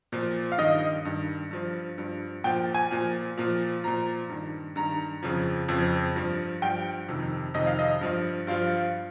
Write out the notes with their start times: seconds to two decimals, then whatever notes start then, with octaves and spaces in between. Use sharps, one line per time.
0.12 A#2 F3
0.52 F5
0.58 G2 D#3 D#5
1.05 G2 D#3
1.51 G2 F3
1.98 G2 F3
2.44 A#2 F3 G5
2.74 G#5
2.91 A#2 F3
3.38 A#2 F3
3.84 A#2 F3 A#5
4.29 G2 D#3
4.76 G2 D#3 A#5
5.23 F2 C#3 F3
5.68 F2 C#3 F3
6.16 G2 F3
6.62 G2 F3 G5
7.08 F2 C3 D#3
7.54 F2 C3 D#3 D#5
7.67 F5
7.79 D#5
8.01 G2 F3
8.47 G2 F3 F4